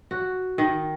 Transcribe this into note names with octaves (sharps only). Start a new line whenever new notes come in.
F#4
D#3